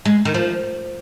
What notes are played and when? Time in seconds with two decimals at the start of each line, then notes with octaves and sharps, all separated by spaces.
0.05 G#3
0.25 D#3
0.34 F3